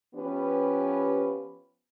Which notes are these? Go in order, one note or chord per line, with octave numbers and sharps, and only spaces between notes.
F3 B3 C#4 G4 B4